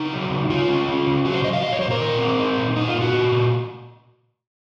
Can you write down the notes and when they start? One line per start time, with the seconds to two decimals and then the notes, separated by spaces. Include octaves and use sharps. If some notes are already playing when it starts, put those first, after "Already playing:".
Already playing: C#3 D#4
0.12 F#3
0.30 C#3
0.49 C#3 F4
0.68 C#4
0.88 C#4
1.06 C#3
1.25 F#3 F#4
1.34 C5
1.43 F#3 D#5
1.53 F5
1.62 A#2 D#5
1.72 C#5
1.81 A#2 C5
1.91 A#4
2.00 D#4
2.19 C4
2.39 D#4
2.57 A#2
2.76 A#2 D#4
2.88 F4
2.94 A#2
3.01 F#4
3.13 A#2
3.32 A#2